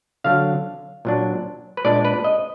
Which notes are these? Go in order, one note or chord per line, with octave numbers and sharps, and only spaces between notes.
D3 F#3 D4 F5
A#2 F#3 D4
B4
A#2 G#3 D4 D5
B4
D#5